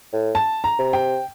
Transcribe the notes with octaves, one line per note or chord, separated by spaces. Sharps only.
A2
A5
A#5
C3
G5